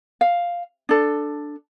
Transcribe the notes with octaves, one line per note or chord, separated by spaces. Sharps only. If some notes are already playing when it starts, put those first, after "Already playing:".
F5
D4 A4